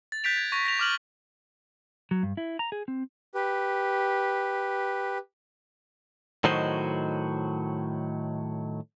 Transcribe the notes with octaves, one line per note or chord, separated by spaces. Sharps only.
A6
F#6 G6 A6 B6 D7 F7
G#6
C#6 A#6 F7
A#6 B6 F7
D6 F6 F#7
F#3
G2
E4
A#5
G#4
C4
G4 B4
A2 D#3 F#3 F#4 C5 D#5